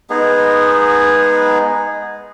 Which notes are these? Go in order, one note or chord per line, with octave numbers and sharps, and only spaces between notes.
G#3 B3 D#4 G#4